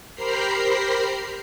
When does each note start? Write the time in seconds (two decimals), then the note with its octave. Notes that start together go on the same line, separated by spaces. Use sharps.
0.14 G4 A#4 C5 A#5 B5 C7